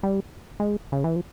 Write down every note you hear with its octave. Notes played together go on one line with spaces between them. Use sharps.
G3
G#3
C#3
E3
F3